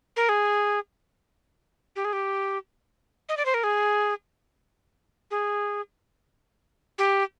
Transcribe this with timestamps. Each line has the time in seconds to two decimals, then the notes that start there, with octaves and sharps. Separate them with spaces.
0.16 A#4
0.29 G#4
1.96 G4
2.05 G#4
2.13 G4
3.29 D#5
3.37 D5
3.45 C5
3.54 A#4
3.63 G#4
5.31 G#4
6.98 G4